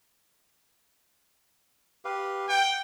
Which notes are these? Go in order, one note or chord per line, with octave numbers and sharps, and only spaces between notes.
G4 B4 F5
F#5 G5